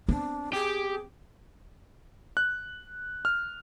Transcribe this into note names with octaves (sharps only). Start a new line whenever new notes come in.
B3 C4 D4
G4 G#4
F#6
F6